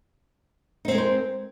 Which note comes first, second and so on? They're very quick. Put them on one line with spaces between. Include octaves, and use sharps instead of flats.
D#4 C4 G#3 A#4 C5